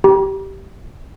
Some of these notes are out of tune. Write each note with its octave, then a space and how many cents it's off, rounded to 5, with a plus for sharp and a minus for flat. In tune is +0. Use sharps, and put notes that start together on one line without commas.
G4 -15 A#5 +45